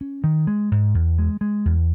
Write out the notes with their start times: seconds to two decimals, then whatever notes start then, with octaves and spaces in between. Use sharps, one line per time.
0.01 C#4
0.24 D#3
0.47 G#3
0.71 G#2
0.94 E2
1.18 G#3
1.41 G#3
1.65 E2